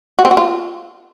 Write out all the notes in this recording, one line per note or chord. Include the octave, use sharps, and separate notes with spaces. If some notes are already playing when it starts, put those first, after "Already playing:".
F#4
C4
F#4
F4